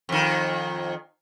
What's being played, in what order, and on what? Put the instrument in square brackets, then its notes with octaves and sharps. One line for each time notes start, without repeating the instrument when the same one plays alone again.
[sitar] F2 D#3